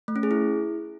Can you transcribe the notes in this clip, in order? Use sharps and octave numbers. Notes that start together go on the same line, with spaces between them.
A3
C#4
G#4
E4